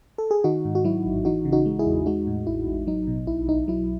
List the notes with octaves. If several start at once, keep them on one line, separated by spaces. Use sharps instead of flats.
A4
G#4
D#3 D#4 F#4
G#2
F#4
F#3 E4
A1
E3 D#4 F#4
C#3
D#4 F#4
G#3
E4 G#4
E2
G#3 D#4 F#4
A2
A1 E4
A1
F#3 D#4
B2
B1 E4
B1 D#4
F#3 E4